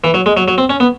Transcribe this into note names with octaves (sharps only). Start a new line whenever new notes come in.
E3
F#3
G#3
F#3
F#3
C4
C#4
B3